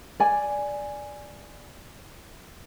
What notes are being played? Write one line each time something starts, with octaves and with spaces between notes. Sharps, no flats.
D5 G#5